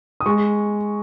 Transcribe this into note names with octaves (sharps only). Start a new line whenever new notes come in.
D#6
G#3 C#6